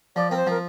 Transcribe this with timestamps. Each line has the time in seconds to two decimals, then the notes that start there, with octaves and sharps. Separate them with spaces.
0.16 F3 D5
0.31 C4 A#4
0.37 C5
0.47 F3 A#4